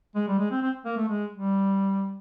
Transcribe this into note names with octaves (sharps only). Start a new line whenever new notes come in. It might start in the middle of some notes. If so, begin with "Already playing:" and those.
G#3
G3
G#3
C4
C4
A#3
A3
G#3
G3